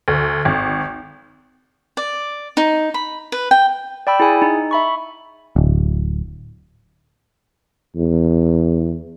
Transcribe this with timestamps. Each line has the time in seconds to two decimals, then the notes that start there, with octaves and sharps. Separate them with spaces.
0.08 D2
0.45 G#1
1.97 D5
2.57 D#4
2.94 B5
3.32 B4
3.51 G5
4.07 D5 G5 B5 E6
4.20 E4 G#4 G#5
4.42 D#4
4.71 E5 B5 C#6
5.56 D1
7.96 E2